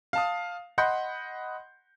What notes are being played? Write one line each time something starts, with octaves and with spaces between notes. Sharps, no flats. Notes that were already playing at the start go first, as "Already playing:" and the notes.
F5 A5 D#6
D#5 F#5 B5 C6 G6